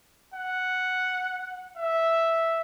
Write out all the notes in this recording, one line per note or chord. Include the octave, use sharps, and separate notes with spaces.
F#5
E5